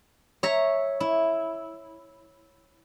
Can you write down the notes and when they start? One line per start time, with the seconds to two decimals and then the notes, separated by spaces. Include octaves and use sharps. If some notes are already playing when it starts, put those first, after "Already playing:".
0.43 C#5 E5 A#5
1.00 E4